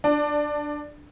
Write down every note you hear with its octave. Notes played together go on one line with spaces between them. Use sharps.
D4